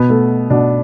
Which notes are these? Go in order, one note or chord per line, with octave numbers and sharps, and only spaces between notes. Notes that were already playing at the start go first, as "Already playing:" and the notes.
Already playing: B2 B3
A3
B2 D4